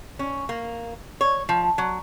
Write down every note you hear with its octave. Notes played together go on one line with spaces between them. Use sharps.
C#4
A#3
C#5
F3
F#3